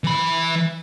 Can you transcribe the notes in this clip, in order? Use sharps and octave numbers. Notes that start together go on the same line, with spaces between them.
E3 B5